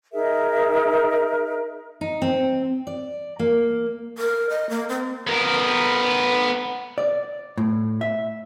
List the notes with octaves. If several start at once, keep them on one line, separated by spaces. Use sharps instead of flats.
D#4 G#4 A#4 E5
D#4
C4
D5
A#3
A#4
D#5
A#3
C4
B3 A#4
D5
A2
E5